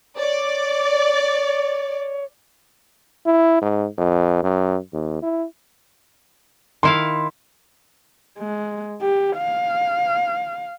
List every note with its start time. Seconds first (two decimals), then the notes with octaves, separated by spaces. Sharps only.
0.19 C#5 D5
3.26 E4
3.62 G#2
3.98 F2
4.43 F#2
4.93 D#2
5.23 E4
6.83 D#3 E4 F5 C6
8.38 G#3
9.02 G4
9.37 F5